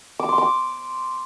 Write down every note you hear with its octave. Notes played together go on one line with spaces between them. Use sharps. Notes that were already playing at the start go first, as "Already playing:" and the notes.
D6
C6
D6